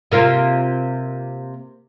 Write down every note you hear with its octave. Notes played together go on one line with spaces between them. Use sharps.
C3 A#3 F4